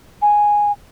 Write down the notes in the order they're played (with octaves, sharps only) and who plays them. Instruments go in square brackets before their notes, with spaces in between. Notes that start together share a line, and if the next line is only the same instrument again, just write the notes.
[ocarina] G#5